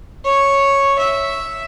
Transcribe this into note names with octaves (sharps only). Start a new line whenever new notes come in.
C#5
E5